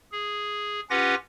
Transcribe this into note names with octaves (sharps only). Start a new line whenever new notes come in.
G#4
C#4 F4 G4 B4 F#5 A#6